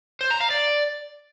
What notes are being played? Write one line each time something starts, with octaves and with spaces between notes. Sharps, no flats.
C5
A#5
F5
D5